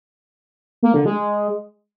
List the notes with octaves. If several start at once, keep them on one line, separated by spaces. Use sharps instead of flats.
A#3
D3
G#3